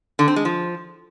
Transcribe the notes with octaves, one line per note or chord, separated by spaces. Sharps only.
D3
C4
G#3
F3